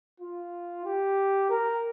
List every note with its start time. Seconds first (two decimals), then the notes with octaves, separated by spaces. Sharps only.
0.20 F4
0.85 G4
1.51 A#4